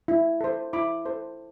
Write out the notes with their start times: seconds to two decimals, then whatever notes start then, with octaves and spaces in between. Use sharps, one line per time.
0.08 E4
0.41 A4 C5
0.73 E4 B5 D6
1.05 A4 C5